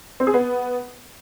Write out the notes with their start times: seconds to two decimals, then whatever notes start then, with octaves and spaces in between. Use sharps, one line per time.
0.20 C4
0.27 G#4
0.34 B3